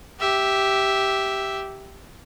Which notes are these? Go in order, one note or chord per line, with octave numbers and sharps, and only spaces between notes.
G4 E5